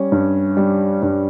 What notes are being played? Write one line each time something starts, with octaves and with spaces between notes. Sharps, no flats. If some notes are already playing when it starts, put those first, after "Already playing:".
Already playing: G3 C#4
G2
G3
G2